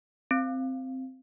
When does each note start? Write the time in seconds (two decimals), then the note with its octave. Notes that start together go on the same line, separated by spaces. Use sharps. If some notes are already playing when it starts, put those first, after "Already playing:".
0.31 C4